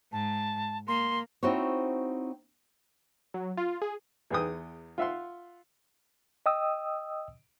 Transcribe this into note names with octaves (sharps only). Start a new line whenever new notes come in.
G#2 A5
A#3 C6
C4 D#4 E4 F#4 C5 C#5
F#3
F4
G#4
E2 B3 G#4 G5 D#6
F4 E5 F#5 C6
D#5 G5 D#6 E6